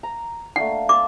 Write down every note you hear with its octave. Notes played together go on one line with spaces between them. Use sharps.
A#5
A3 A#3 D4 F#5
F5 A5 C6 D6